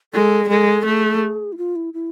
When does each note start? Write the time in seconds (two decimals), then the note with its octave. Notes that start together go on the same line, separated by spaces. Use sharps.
0.13 G#3 A4
0.44 G#4
0.49 G#3 A4
0.85 A3 G#4
1.52 E4
1.58 F4
1.76 E4
1.94 E4